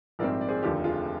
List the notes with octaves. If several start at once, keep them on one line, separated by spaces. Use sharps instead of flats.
A#1 G#2 G3 C4 A#4 D5
D5
G#4 C5
F1 D#2 D3 F3 G4
F4 G#4